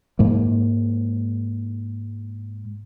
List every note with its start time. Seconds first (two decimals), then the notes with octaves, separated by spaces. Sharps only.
0.19 G#2 G#3 A#3